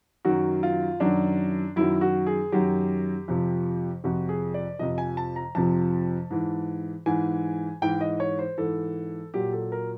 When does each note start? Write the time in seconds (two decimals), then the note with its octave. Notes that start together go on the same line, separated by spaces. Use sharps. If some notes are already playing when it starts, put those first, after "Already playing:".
0.25 F#2 D#3 F#3 F#4
0.63 F4
1.00 F#2 D#3 F#3 D4
1.76 F#2 D#3 F#3 E4
2.01 F#4
2.27 G#4
2.52 F#2 D#3 F#3 G4
3.28 F2 C3 F3
4.04 F2 C3 F3 F#4
4.29 G#4
4.54 D5
4.79 F2 C3 F3 D#5
4.98 G#5
5.17 A5
5.36 A#5
5.55 F2 C3 F3 A5
6.30 G#2 E3
7.06 G#2 E3 G#5
7.82 G#2 E3 G5
8.01 D#5
8.20 C#5
8.39 C5
8.58 G#2 E3 A4
9.34 A#2 F#3 G4
9.52 A4
9.72 A#4